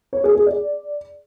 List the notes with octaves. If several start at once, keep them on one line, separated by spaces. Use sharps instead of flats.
C#5
G#4
G#4
D5